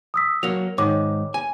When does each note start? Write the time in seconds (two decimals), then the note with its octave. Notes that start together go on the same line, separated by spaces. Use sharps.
0.14 D#6 E6 B6
0.43 F#3 A#3 F7
0.78 G#2 D#3 C#5 D6
1.34 G#5